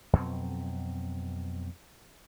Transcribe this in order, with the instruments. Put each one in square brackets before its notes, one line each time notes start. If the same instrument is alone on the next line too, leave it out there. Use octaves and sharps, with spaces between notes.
[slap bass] F2 B2 F#3 C4